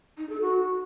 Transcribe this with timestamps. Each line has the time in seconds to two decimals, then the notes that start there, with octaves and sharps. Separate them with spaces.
0.18 D#4
0.29 A4
0.41 F#4